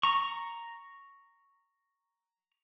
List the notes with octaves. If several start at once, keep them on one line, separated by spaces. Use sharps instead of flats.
A#5 C#6